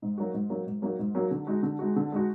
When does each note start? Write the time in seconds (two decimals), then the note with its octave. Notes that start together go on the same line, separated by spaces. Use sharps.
0.02 G#2
0.18 F#3 A#3 D#4 F#4
0.34 G#2
0.50 F#3 A#3 D#4 F#4
0.66 G#2
0.82 F#3 A#3 D#4 F#4
0.99 G#2
1.15 F#3 A#3 D#4 F#4
1.31 D3
1.47 G#3 D#4 F#4
1.63 D3
1.79 G#3 D#4 F#4
1.96 D3
2.12 G#3 D#4 F#4